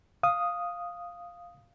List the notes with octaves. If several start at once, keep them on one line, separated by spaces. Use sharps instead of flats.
F5 D#6